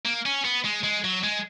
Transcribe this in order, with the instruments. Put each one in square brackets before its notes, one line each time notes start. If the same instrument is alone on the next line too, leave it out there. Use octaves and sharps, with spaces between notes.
[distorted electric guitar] A#3
C#4
B3
G#3
G#3
F#3
G#3